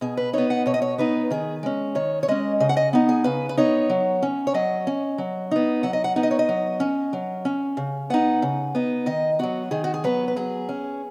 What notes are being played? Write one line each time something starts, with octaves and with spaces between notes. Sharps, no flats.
B2 G#4
B4
B3 D#4 C#5
F#5
B2 C#5
D#5
C#5
B3 D#4 B4
D#3 G#4
G#3 C#4
D#3 C#5
C#5
G#3 C#4 D#5
C#3 D#5
F#5
D#5
B3 D#4
G#4
C#3 B4
B4
B3 D#4 C#5
F#3
C#4
C#5
F#3 D#5
C#4
F#3
B3 D#4
F#3 F#5
D#5
F#5
B3 D#4 F#5
D#5
C#5
D#5
F#3
C#4
F#3
C#4
C#3
B3 D#4 F#5
C#3
B3 D#4
D#3 D#5
F#3 B3 F#4
D#3 G#4
F#4
G#4
F#3 B3 B4
B4
F#3 G#4
C#4